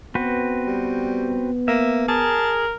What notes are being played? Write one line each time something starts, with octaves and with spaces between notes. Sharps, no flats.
B3 C4 F#4 B4
G3
A#3 E5
G#4 A#4 A5